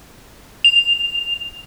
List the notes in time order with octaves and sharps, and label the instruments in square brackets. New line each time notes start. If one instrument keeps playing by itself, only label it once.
[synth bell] F7